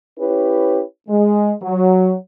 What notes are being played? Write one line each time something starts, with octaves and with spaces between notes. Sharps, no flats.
C#4 E4 G4 B4 C#5
G#3
F#3